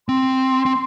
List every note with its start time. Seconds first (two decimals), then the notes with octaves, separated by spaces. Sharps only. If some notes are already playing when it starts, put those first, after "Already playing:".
0.08 C4 C6
0.66 C4